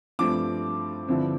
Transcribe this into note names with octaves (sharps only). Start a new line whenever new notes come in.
G2 F3 A3 C4 D6
G2 D3 F3 C4 E4